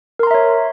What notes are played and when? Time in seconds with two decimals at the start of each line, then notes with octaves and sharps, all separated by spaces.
0.19 A#4
0.23 C6
0.27 A#5
0.31 E5
0.34 C#5